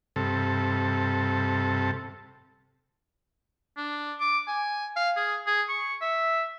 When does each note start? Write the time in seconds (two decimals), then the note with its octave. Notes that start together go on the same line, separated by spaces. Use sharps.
0.16 G2 C3 A4
3.77 D4
4.20 D6
4.48 G#5
4.96 F5
5.17 G#4
5.47 G#4
5.69 C#6
6.01 E5